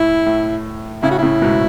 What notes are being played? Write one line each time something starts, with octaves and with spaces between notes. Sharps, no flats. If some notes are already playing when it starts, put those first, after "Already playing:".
Already playing: A2 E4
A2
A2 C#3 E4
F#4
A2 C#3 E4
G#2 B2